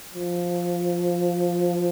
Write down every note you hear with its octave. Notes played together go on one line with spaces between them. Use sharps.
F3